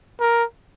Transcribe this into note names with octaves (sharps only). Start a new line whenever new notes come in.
A#4